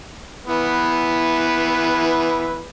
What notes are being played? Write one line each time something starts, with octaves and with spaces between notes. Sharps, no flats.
E3 B3 B4